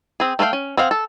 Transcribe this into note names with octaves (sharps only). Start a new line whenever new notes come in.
C4 G#4
A3 A#4 B4 F5 G5
C#4
C4 G#4 F5 F#5
A4